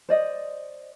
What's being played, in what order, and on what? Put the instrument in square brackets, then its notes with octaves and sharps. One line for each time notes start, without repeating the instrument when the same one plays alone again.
[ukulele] C5 D5 D#5